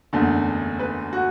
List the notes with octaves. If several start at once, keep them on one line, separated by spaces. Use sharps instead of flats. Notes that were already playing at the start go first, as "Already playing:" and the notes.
F#1 E2 D3 A3
B4
F#4